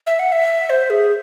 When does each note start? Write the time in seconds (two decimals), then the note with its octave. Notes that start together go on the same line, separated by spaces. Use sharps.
0.07 E5
0.19 F#5
0.32 E5
0.70 C5
0.90 G#4